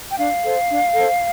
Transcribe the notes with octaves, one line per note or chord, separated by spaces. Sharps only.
G5
D4 F5
A4 C5
D4
A4 C5